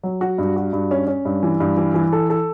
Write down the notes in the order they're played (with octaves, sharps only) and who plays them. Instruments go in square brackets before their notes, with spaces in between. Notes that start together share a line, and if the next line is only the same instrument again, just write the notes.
[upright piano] F#3
F#4
G2
F#4
G2
C#4
C#4
G2
E3
G2
E3
E3
A4
A4